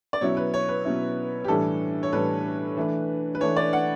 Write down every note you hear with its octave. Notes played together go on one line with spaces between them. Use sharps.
D5
B2 F#3 C#4 E4 C#5
B4
C#5
B4
B2 F#3 C#4 E4
G4
A2 E3 G3 D4 A4
C#5
A2 E3 G3 D4 B4
E3 A3 D4
B4
E3 A3 D4 C#5
D5
F#5